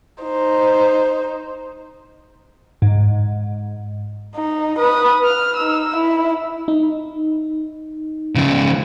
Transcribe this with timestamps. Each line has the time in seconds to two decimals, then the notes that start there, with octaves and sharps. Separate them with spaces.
0.22 D#4 C5
2.82 G#2
4.35 D#4
4.79 B4 D#6
5.24 F6
5.57 D#4 E6
5.96 E4
6.68 D#4
8.36 C#3 F3